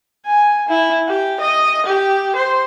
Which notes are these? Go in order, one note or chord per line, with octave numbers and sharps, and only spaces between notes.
G#5
E4
G4
D#5
G4
C5